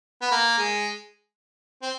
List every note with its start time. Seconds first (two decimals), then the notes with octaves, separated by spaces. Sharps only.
0.21 B3
0.31 A#3
0.58 G#3
1.82 C4